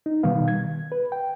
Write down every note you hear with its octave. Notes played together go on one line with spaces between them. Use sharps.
D#4
B2 D#3 G3 B3 F5
G#6
B4
G5